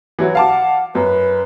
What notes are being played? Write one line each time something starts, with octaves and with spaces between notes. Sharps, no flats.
E3 F#3 F#4
F5 F#5 A5 D6
F#2 B4